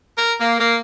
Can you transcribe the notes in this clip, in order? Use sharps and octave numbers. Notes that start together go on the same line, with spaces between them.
A#4
A#3
A#3